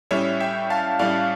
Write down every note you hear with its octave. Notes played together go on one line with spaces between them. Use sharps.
A2 G3 C#4 C#5 E5
E5 G5
F5 A5
A2 G3 C#4 D5 F5